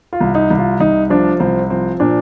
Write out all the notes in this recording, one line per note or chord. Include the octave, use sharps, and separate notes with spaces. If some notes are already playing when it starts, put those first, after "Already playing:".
F4
C2
D#4
C2
F4
C2 D#4
F3 D4
C2 C4
F3 C4
A#2 D4